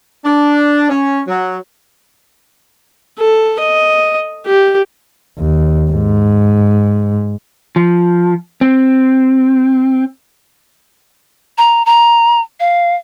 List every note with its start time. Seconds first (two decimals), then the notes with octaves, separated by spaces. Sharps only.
0.25 D4
0.90 C#4
1.28 F#3
3.19 A4
3.60 D#5
4.46 G4
5.39 D#2
5.91 G#2
7.76 F3
8.61 C4
11.58 A#5
11.86 A#5
12.60 F5